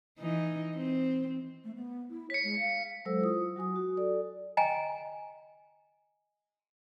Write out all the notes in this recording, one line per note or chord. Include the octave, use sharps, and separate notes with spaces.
E3 D#4
C4
A3
B3
E4
C#5 B6 C#7
G#3
F5
F#3 G#3 A4 C5 E6
E4 F4 D#6
F#3 F#4 G#5 D#6
F#4
A4 D5
D#5 G5 G#5 A#5